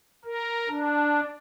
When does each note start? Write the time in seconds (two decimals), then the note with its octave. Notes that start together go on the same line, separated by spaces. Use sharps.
0.25 A#4
0.69 D4